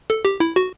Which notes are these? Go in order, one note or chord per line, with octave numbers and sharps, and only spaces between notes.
A4
G4
E4
F#4